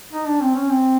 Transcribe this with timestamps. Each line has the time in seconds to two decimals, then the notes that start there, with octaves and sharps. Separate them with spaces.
0.12 D#4
0.27 D4
0.41 C4
0.55 C#4
0.69 C4